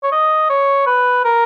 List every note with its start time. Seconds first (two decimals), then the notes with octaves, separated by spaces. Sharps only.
0.03 C#5
0.12 D#5
0.50 C#5
0.86 B4
1.24 A#4